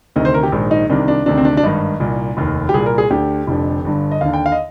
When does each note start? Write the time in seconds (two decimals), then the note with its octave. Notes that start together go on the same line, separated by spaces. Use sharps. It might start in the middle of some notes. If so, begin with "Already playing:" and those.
0.16 D2 C3 D#3 D#5
0.25 C5
0.34 A#4
0.43 G4
0.52 A#1 G#2 D#3
0.71 D#4
0.89 C2 C3 D#3 D4
1.08 D4
1.26 D2 C3 D#3 D4
1.38 C4
1.45 D4
1.57 D4
1.63 G#1 G2 D#3 D#4
2.00 C2 A#2
2.37 F1 D#2 D#3
2.69 G4
2.74 C2 A#2 G#4
2.86 A#4
2.98 G#4
3.10 D2 D3 G4
3.47 F1 F2 D3
3.84 G1 G2 D3
4.12 D#5
4.21 D#2 D3 F5
4.34 G5
4.46 F5
4.52 D#5